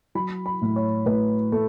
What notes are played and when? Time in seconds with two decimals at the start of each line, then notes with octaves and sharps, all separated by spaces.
0.15 F#3 B5
0.46 B5
0.62 A2
0.76 C#5
1.06 A2 B4
1.52 A3